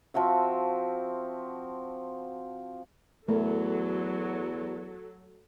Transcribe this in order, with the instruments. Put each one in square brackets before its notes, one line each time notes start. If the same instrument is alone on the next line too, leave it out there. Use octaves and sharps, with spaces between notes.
[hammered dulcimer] F3 C4 F#4 E5
[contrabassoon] E2 [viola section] F#3 A4 [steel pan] A3 A#4